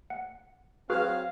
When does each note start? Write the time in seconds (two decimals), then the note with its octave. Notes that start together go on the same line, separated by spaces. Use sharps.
0.10 F#5
0.90 F#3 C4 F#4 G#4 B4 F5